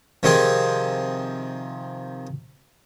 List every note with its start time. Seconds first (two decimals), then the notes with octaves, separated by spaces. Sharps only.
0.23 C3 D#3 F3 C4 G#4